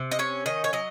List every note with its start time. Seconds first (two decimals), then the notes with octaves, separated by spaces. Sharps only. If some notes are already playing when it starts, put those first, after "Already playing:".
Already playing: C3
0.11 D#5
0.19 C#4 C#5
0.46 D#3 D#5
0.64 C#5
0.73 F#3 D#5